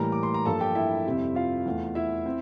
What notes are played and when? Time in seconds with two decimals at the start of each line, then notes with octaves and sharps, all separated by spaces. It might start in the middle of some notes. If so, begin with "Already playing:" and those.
Already playing: A2 E3 G3 A#3 A#4 A#5
0.12 D6
0.23 C6
0.34 A#5
0.45 G2 F3 A#3 A4 A5
0.61 G4 G5
0.75 E4 E5
1.06 F2 C3 G3 C4
1.35 F4 F5
1.65 E2 E3 A3
1.95 E4 E5
2.26 C4